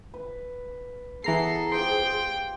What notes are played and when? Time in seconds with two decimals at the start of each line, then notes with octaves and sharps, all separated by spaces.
0.14 B4
1.24 E3 B3 G#4 A4 A#5 C7
1.72 F4 G4 C5 G5 C6